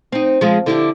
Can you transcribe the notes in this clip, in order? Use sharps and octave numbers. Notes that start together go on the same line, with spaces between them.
C4 D#4
F3 G#3
D3 E4 G4